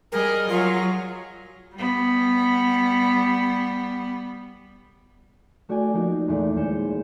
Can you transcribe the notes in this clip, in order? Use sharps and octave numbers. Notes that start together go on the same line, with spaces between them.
G3 G#4 A#4 D#5
F#3 F4 G#4 A#6
G3 B3
A3 F#4 D5 G5 G#5
F3 A#3 D#4 F#4
E2 A#2 E3 A3 D4
D#2 G#3 G6 C#7 E7